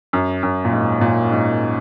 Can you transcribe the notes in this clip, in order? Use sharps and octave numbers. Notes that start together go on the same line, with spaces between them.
F#2
F#2
A#2
G#2
A#2
G#2